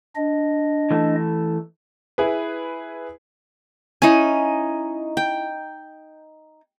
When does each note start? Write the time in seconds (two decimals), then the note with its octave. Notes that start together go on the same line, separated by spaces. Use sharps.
0.16 D4 D#5
0.91 E3 A3 A4
2.18 E4 G#4 B4
4.02 C#4 D#4 E4 G#5
5.17 G5